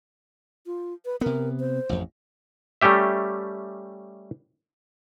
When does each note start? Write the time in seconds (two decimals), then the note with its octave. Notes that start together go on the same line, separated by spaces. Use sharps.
0.66 F4
1.05 B4
1.21 C3 B3 A#4
1.60 C5
1.89 A1 F2
2.81 G3 A3 C#4 G4 E5